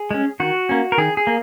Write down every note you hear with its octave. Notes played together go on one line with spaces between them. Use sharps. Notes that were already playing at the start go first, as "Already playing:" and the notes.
Already playing: G#4
G#3 C#4
D#3 F#4
A#3 C#4
A#4
D#3 G#4
G#4
A#3